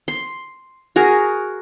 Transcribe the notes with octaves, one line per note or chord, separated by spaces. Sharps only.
C6
F#4 G#4 A#4